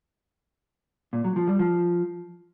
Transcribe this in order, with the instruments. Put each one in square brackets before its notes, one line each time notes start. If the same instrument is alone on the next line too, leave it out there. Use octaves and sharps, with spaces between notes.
[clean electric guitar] A#2
F#3
F3
G3
F3